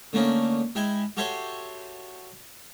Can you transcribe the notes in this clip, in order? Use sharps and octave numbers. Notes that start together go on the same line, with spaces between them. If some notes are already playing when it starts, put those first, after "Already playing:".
D3 A3 A#3 C#4 D#4
G#3 E4 G5 G#5 B5
F#4 G4 A4 C#5 E5 C6